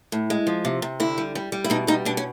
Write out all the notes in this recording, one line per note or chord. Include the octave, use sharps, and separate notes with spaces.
A2
G#3
F3
C3
C3
D3 E4
G3
G3
G3
E4
B2 D#4
G3 D#4
B2 D4
C#4